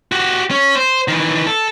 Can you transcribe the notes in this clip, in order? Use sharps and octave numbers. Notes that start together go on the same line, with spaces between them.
F#4 G4
C#4
C5
D#3 E3
A4